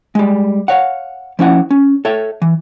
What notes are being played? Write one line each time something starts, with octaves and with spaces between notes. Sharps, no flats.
G3 G#3
C#5 F5 F#5
F3 C#4 E4 F#5
C#4
A4 C#5 E5
E3